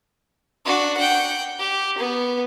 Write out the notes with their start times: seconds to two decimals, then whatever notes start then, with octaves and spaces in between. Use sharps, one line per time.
0.65 D4 F#4
0.97 F#5 G5
1.59 G4
1.98 B3